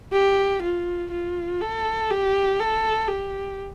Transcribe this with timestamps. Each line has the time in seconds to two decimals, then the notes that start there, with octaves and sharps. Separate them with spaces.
0.13 G4
0.62 F4
1.11 F4
1.61 A4
2.11 G4
2.59 A4
3.09 G4